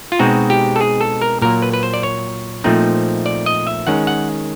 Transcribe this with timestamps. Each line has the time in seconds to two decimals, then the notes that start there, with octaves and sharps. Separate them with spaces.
0.12 F4
0.19 B2 G#3 C4 D#4 F#4
0.50 G4
0.76 A4
0.81 G#4
1.01 A4
1.22 A#4
1.42 A#2 F#3 A#3 A#4
1.62 B4
1.73 B4
1.83 C5
1.94 D5
2.03 C#5
2.64 A#2 F3 A3 C4 D#4
3.26 D5
3.46 D#5
3.67 E5
3.87 D#3 G#3 C#4 F#5
4.07 F#5